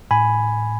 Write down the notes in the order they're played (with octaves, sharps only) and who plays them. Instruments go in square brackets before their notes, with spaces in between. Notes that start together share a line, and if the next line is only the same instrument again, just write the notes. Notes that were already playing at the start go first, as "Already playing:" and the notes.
[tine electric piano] A2 G#5 B5